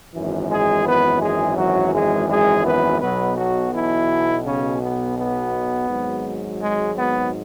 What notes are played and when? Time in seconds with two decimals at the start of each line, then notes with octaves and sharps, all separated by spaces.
0.14 G#1 F#2 E3
0.50 G#3 G#4
0.86 B3 B4
1.21 G#3 G#4
1.57 F#3 F#4
1.93 G#3 G#4
2.29 G#3 G#4
2.65 B3 B4
3.01 B1 B2 F#3 B3 B4
3.37 F#3 F#4
3.73 E3 E4
4.45 C#3 C#4
4.81 B3
5.17 B3
5.89 G#1 G#2 F#3
6.60 G#3
6.96 B3